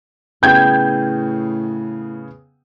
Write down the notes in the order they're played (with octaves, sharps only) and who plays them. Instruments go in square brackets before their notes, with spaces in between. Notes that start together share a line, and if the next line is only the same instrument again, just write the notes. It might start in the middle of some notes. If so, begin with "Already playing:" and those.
[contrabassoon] A2 [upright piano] C#3 B3 G#4 [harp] G5 [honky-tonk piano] G6 G#6